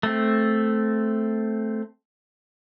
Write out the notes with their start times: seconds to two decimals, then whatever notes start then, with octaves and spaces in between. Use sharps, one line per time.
0.03 A3 C4